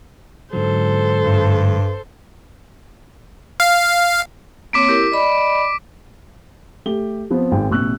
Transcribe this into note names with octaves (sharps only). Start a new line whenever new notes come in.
G#2 D3 F#3 A4 C5
G2
F5
A#3 C4 C#5 D6 B6 D7
E4 G4 A#4
D5 D#5 B5
A3 G4 G7
F3 B3 C4
G#1 D#3 G#3 C4 G5
A1 B2 C#6 E6 F#6